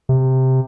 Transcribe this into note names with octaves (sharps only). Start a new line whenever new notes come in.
C3